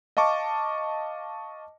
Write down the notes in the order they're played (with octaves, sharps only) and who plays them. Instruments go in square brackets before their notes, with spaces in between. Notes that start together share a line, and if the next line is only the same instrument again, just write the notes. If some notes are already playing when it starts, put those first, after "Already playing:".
[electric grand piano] D#5 F5 A5 C#6 D6